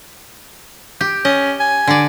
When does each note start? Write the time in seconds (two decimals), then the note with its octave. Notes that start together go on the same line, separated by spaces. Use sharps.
1.01 G4
1.25 C#4 D#5
1.60 G#5
1.87 D3 D5